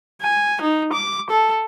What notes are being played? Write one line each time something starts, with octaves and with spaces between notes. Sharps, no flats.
G#5
D#4
D6
A4